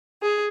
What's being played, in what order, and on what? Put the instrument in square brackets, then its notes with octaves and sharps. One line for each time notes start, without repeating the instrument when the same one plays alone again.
[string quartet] G#4